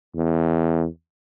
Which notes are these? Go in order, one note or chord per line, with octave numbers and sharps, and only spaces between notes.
E2